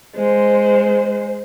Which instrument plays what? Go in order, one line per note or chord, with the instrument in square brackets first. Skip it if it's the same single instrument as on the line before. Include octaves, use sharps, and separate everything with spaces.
[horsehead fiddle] G#3 C5